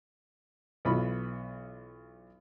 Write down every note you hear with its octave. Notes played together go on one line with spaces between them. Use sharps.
B1 E3 B3 F4 F#4 B5